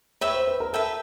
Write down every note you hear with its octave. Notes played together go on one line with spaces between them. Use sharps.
B4 C#5 E5 G5
C5
B4
A#4
A4 B4 E5 G5